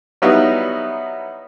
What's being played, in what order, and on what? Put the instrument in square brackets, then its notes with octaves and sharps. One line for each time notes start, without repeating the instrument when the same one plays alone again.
[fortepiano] F#3 G3 B3 D#4 E4